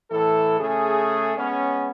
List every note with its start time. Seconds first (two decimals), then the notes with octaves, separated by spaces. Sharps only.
0.11 A2 E3 A4
0.59 C#3 A3 G#4
1.38 G#3 B3 C#4